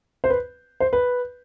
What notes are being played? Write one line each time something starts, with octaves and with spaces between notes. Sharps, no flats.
C5
B4
C5
B4